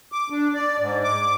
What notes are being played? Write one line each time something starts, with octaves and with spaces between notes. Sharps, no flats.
D6
D4
D5
G#2
D6